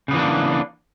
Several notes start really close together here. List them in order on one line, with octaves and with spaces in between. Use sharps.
C#3 B3 E3 A#3 D4